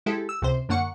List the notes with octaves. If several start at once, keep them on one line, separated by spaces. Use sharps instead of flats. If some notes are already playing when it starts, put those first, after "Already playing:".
G#3 E4 G4 A4
E6
C#2 C3 C5
F#2 D3 A#3 F#5 C#6 C#7